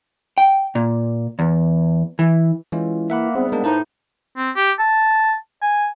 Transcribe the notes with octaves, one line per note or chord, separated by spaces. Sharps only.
G5
A#2
E2
E3
E3 G#3 C#4 F4
A#3 E5 F#5 B5
G#2 G3 B3 C4
G#3 A#3 D4
A2 D#4 B4 C5 A5
C4
G4
A5
G#5